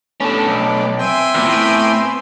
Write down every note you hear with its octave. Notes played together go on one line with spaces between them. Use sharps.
A3 B3 C#4 D4 A4
B1
C4 E5 G5 G#5
E2 A#2 B3 C4
A2